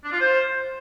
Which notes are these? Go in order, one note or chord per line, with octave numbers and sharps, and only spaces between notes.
D4
F4
C5